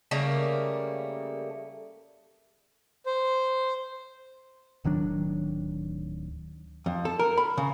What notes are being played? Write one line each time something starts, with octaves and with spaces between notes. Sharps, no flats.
C#3 G3 A3 A#3
C5
D1 D#3 F#3 D4
F2
A4
A#4
B5
C#3